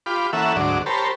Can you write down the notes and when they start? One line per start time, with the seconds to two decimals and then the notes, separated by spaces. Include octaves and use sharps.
0.06 F4 G4 B5 D6
0.33 E3 A#3 C#4 A4 E5 F#5
0.56 D2 G#2 F#3 D5
0.86 G4 A#4 C5 C#5 A5 B5